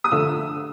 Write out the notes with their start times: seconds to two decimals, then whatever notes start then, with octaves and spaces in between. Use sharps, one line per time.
0.04 D#6
0.12 D3 F3 A3 E6